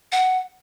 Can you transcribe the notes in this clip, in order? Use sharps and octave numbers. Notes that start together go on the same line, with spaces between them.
F#5